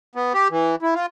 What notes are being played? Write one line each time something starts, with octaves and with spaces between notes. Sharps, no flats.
B3
G4
E3
E4
F4